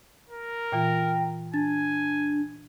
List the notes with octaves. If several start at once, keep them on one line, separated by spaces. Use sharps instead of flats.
A#4
A#2 E3 F4 G5
D4 G#5 A6